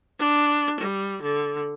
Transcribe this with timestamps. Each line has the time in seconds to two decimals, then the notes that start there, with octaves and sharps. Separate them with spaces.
0.20 D4
0.80 G3
1.22 D3